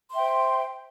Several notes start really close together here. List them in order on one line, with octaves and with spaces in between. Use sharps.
C6 E5 G5 C5